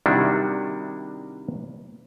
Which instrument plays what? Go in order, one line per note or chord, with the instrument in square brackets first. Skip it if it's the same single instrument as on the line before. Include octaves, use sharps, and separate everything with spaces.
[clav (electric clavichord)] C3 D#3 G3 D4 E4 F#4